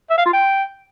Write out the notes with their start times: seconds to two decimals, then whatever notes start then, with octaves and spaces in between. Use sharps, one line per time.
0.10 E5
0.18 F5
0.25 F4
0.33 G5